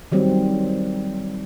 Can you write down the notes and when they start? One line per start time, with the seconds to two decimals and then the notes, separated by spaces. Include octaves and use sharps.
0.12 D#3 F#3 G3 C4